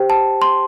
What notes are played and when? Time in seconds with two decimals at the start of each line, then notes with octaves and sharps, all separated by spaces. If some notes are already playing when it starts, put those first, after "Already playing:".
Already playing: G4 C5 G5
0.10 A5
0.42 C6